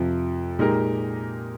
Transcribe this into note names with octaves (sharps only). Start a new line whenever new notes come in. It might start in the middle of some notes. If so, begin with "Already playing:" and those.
Already playing: F2 C3 F3
A#2 G#3 D#4 G4 A#4